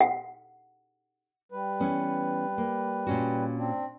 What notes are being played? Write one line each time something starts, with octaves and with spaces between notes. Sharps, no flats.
F#5
G3 B4
E3 B3 C#4
A#3
A#2 C#4 F#4
C4 D4